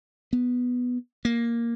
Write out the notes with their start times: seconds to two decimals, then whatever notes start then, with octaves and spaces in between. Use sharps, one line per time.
0.33 B3
1.25 A#3